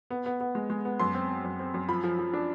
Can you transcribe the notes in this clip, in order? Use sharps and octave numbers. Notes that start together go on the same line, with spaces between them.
B3
B3
B3
G#3
G#3
B3
F#2 C6
C4
C4
F#2
C4
F#2
F3 B5
F3
F3
D4